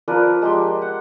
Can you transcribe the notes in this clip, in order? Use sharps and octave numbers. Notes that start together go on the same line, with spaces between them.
F3 A#4 B4 D5
G#3 G4 C6
F#5